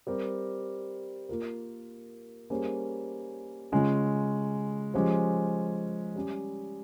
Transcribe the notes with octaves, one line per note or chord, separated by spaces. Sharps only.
G3 C4 G4 A#4
A#3 F4 A#4
G3 A#3 C#4 G#4 C5
C#3 G#3 C#4 F4
F3 G#3 C#4 G4 C5
G3 C#4 G4